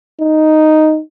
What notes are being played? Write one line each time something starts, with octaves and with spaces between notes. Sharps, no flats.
D#4